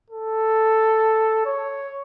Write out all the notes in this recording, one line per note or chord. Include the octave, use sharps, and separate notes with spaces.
A4
C#5